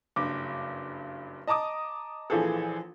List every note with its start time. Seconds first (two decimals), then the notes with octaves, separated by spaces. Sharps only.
0.16 F#1 G2 D6
1.47 D#5 A5 A#5 D6 D#6
2.30 A#1 E3 F3 G#4 A4